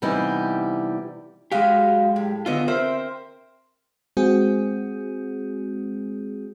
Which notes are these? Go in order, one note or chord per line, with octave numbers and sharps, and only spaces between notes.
C3 E3 G3 B3 D#4 E4
G#3 F#4 G4 D#5 F5
A2
D3 B3 F4 D#5 E5
C4 A#4 C5 E5
G#3 C4 F#4 G#4